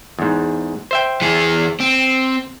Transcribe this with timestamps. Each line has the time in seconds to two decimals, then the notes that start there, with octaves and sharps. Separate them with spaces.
0.19 E2 G#2
0.91 C5 E5 G5
1.22 E3 G#4
1.80 C4